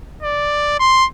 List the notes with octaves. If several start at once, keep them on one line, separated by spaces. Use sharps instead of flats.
D5
C6